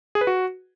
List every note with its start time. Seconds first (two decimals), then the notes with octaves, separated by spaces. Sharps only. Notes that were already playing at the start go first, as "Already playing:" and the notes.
0.15 G#4
0.21 B4
0.27 F#4